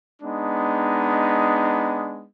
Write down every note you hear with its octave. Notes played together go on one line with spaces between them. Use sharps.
G#3 B3 D4 D#4